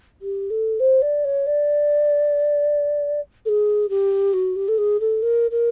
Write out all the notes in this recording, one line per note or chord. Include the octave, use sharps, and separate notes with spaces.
G4
A4
C5
D5
C#5
D5
A4
G#4
G4
F#4
G4
A4
G#4
A4
A#4
A#4